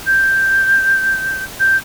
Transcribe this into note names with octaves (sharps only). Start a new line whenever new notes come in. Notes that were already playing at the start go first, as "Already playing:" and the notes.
G6
G6